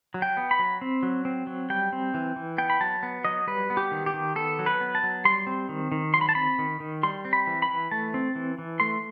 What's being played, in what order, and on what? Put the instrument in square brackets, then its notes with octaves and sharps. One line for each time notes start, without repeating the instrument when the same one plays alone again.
[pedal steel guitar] F#3
G5
B3
B5
F#3
C4
F#3
C4
F#3
G3 G5
C4
E3
E3
B3 G5
B5
F#3 A5
B3
F#3 D#5
G3 B4
B3
G4
D#3
G4
D#3
B3 A4
F#3
B4
B3
A5
F#3
G3 C6
C4
D#3
D#3
F#3 C6
B5
A5
C4 B5
D#3
D#3
G3 C6
C4
B5
E3
B5
E3
A3 A5
C4
E3
E3
A3 C6